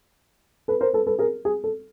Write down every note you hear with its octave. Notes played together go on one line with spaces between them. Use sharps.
A4 B4
A#4 C5
A4 B4
A4 B4
G#4 A#4
G#4
A4